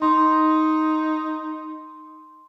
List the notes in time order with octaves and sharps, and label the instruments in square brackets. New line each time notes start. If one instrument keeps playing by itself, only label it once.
[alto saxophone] D#4 [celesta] C6